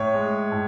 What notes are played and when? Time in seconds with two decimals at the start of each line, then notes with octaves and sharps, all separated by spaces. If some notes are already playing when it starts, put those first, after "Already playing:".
Already playing: A2 C#5
0.14 G#3
0.52 A2